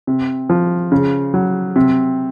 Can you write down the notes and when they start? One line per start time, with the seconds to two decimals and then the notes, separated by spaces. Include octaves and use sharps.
0.07 C3
0.50 F3
0.92 C#3
1.34 F#3
1.76 C3